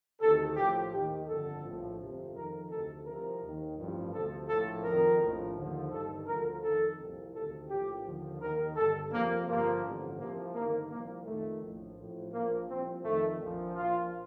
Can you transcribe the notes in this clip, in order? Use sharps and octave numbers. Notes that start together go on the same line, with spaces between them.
D2 C3 D#3 A4
A#1 A2 F3 G4
D#2 D#3 G4
G1 F2 D3 A4
A#1 A2 F3
G1 F2 C3 F3
F2 D#3 A#4
D2 C3 D#3 A4
C2 C3 F3 A#4
D#2 D#3
A1 G2 F3
D2 C3 F3 A4
A#1 A2 F3 A4
F2 D#3 A#4
A#1 A2 F3
D#2 D3 F3
G1 G2 D#3 A4
D2 D3 F3 A#4
F2 D#3 A4
C2 A#2 F3
D2 C3 D#3 A4
A#1 A2 F3 G4
D#2 D3 F3
D#2 D#3 A#4
G1 G2 D3 A4
F2 C3 F3 A#3
G1 G2 F3 A#3
A1 G2 D3 F3
C2 C3 F3 A#3
G1 G2 D#3 A#3
C2 A#2 F3 A#3
F2 D#3 A3
A#1 A2 F3
A1 A2 F3
A#1 A#2 F3 A#3
C2 A#2 F3 C4
F2 D#3 A3
A#1 A#2 F3
A#1 A#2 F3 F4